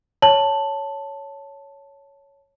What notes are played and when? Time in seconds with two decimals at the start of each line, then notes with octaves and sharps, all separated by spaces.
0.22 C#5 A5 F#7